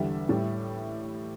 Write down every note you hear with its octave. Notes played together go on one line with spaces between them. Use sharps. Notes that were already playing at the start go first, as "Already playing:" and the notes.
Already playing: E2 D3 G3 E5
A2 G3